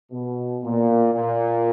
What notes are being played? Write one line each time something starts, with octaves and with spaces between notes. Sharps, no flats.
B2
A#2
A#2